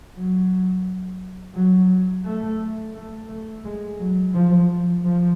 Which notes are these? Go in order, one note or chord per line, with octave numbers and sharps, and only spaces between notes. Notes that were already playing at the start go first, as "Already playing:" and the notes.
F#3
F#3
A3
A3
A3
G#3
F#3
F3
F3